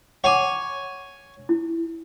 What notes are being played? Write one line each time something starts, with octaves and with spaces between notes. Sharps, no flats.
C#5 F#5 G#5 D6
E4